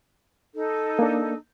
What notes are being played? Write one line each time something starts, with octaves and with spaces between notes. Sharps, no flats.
D#4 A4
A#3 D4